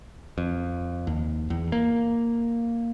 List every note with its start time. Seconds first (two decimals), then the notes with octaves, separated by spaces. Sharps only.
0.38 F2
1.07 D#2
1.50 E2
1.72 A#3